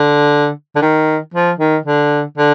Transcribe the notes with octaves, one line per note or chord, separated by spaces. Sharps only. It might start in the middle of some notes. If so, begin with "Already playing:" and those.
Already playing: D3
D3
D#3
F3
D#3
D3
D3